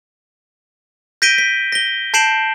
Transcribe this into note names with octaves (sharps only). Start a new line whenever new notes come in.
G6 A#6 B6 D7 D#7 G7
B6
A#6 G7
A5 G6 C7 D7 E7 F#7